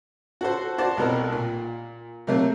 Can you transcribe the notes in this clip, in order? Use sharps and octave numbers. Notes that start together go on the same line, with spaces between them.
F#4 A4 C5
F#4 C5 D5 A5
C2 B2 A4 A#4
A#2
C3 F#3 A3 A#3